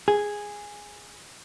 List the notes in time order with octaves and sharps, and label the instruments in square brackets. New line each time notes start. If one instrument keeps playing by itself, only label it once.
[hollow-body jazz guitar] G#4